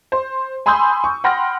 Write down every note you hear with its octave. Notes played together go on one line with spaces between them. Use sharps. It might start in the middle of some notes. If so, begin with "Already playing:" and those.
C5
G#5 B5 C6 D#6 E6 G6
C#6
F#5 G5 B5 C6 F6 A#6